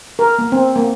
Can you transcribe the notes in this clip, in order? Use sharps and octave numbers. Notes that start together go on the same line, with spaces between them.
A#4
A#3
C4
A#3